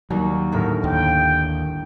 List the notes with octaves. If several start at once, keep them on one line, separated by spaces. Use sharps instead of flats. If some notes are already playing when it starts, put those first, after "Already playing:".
D#2 F#3 G3 A#3
G1 A2 A#4 E5
D#2 G5
D7